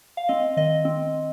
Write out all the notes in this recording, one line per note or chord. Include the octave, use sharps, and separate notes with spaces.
F5
C4 D#5
D#3 D#5
C4